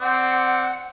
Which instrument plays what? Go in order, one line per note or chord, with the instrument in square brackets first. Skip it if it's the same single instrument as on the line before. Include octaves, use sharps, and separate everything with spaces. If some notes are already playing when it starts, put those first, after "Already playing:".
[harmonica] C4 D5 [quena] F#5